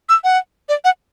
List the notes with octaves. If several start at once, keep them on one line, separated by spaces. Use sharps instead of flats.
E6
F#5
D5
F#5